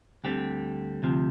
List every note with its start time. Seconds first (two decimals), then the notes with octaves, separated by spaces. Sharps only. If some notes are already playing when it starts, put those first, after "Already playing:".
0.24 D2 D3 G3 C4 G4
1.03 D2 C3 F3